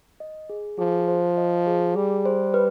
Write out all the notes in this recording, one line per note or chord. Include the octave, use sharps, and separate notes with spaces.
D#5
G#4
F3 G#4
C5
D#5
G#4
G3 G#4
C5
B4